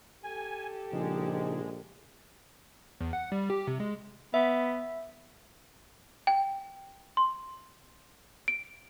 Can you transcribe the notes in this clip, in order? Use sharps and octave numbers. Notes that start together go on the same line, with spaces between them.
G4 A4 G#5
A#1 C#3 F3 G#3 D#4
E2
F#5
G3
G4
C3
G#3
B3 E5
G5
C6
D7